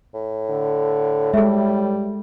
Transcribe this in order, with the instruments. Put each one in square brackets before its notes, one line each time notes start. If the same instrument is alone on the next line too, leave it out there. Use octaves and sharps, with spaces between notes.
[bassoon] A2
[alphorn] D3
[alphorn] G3 [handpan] G#3 A4 [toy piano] G#4 E5